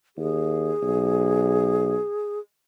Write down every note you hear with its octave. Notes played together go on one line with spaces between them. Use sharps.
D#2 G#4
B1